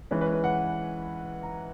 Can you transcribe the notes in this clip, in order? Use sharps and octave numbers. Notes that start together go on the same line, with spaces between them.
E3 G#3 C#4 B4
B4
B4
F#5
A#5